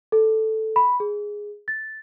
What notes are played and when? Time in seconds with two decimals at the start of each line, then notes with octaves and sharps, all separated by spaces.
0.12 A4
0.76 B5
1.00 G#4
1.68 A6